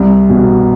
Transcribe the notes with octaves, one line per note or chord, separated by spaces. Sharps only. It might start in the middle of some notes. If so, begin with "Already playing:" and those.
Already playing: C2
B2